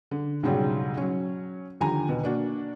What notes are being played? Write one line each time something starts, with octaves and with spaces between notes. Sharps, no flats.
D3
B1 G#2 C#3 F#3 G3
F#3 C#4
D#2 D3 F3 G4 G#5 A#5
D#2 B2
A#3 D4 F#4